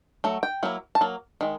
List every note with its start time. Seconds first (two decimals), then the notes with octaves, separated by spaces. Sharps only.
0.24 F#3 A3
0.43 G5
0.63 F#3 A#3 E4
0.95 A5
1.01 F#3 A#3
1.41 D#3 G#3